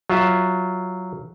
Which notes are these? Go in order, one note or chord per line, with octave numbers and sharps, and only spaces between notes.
F#3 F4 E5